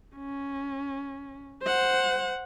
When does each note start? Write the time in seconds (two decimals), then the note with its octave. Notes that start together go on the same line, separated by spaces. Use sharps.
0.16 C#4
1.62 C5 F#5